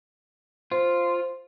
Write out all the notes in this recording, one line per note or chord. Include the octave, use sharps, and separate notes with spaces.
F4 C5